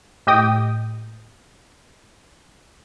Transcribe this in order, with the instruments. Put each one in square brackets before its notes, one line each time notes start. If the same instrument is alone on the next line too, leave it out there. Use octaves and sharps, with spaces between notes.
[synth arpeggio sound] A2 G4 D#5 G5 D#6